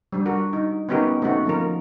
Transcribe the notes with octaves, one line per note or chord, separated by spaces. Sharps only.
G3 D4
F#4 A#4
D#4
B3 C#4 D#4 F#4 G4 A#4
A3 C4 C#4 D#4 F#4
F3 A#3 A#4